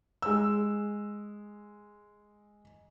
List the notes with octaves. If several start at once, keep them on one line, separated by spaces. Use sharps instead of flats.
G#3 E6